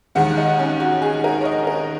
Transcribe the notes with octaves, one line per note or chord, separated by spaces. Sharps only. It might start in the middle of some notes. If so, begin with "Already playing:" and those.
D#2 D#3 G#3 F#5
D#4
C#4
F#4
G#4
A#4
C#5
D#5
A#4